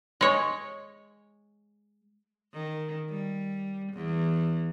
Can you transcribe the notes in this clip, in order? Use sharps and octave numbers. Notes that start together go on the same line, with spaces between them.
G#3 C#5
D#3
G3
E2